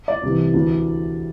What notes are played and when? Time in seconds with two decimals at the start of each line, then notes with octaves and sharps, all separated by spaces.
0.08 D5
0.23 C2 C3 E3
0.54 D2 C3 E3